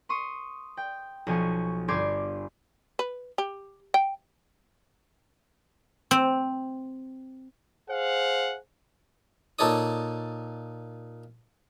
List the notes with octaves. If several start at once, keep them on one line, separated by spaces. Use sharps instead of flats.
C6 C#6 D#6
G5
B1 F3 G#5 C#6
G1 G4 C6 D6 G#6
B4
G4
G5
C4
G#4 C5 F5 F#5
A#2 D#4 A4 C#5 D5 D#6